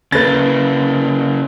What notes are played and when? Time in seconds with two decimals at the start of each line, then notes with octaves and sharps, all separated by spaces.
0.12 C#3 A#3 B4 A6